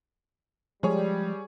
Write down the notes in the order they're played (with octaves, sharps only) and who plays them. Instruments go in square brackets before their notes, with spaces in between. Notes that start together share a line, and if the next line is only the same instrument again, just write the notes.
[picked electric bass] F3 G#3 [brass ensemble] G3 [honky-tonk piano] G#4 C#5